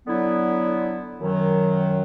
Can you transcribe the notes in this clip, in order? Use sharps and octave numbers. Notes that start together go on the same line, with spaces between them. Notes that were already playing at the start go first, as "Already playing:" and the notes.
D3 F#3 B3 E4
F#2 D#3 F#3